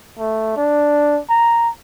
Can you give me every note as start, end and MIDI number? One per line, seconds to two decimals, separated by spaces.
0.19 0.56 57
0.57 1.20 62
1.29 1.70 82